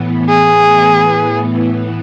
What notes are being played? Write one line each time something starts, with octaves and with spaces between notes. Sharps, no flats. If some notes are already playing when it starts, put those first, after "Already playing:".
Already playing: A2 E3 B3
G#4